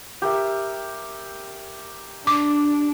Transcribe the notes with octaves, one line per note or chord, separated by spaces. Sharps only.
G4 A#4 E5
D4 D6